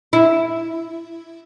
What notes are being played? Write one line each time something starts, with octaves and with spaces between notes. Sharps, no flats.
E4